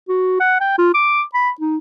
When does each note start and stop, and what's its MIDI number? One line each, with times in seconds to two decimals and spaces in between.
0.08 0.40 66
0.40 0.60 78
0.60 0.75 79
0.78 0.91 65
0.94 1.22 86
1.34 1.50 83
1.60 1.77 63